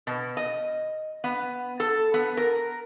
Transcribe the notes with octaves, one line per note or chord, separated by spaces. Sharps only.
B2
D#5
B3
A4
B3
A#4